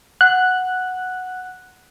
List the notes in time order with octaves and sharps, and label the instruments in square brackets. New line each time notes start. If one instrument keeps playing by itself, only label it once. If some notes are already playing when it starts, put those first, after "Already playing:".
[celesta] F#5 [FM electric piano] F#6